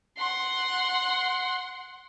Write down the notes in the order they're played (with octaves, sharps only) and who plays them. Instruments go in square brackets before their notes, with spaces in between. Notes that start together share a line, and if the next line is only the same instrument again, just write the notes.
[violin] F#5 C6